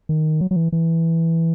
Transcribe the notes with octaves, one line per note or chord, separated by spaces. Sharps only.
D#3
F#3
F#3
E3
E3